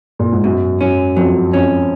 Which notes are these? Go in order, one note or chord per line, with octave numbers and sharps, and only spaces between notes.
A#2
G#2
F#2 B2
F#2 C#4
F2 F#3
F2 C#4